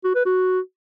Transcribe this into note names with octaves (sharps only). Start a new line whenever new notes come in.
F#4
B4
F#4